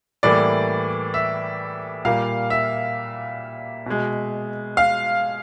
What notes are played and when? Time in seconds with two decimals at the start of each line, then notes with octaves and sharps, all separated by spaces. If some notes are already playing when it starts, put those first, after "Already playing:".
0.23 A2 E3 G3 A#3 D5
1.14 E5
2.05 A#2 G3 A#3 F5
2.50 E5
3.86 B2 G#3
4.77 F5